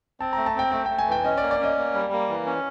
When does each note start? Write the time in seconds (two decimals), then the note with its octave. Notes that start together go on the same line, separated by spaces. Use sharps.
0.20 C4 A5
0.33 A3 A#5
0.46 A5
0.55 C4 G5
0.72 A3 G5
0.86 A3 G5
0.99 G#5
1.07 E3 G5
1.25 C#4 D#5
1.38 D5
1.42 A#3
1.51 D5
1.60 C#4 D#5
1.77 A#3
1.94 G3
2.12 A#3
2.29 E3
2.46 C#4